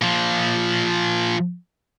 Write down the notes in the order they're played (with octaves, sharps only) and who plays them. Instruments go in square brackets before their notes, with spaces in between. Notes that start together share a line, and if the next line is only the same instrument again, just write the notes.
[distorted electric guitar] A#2 F3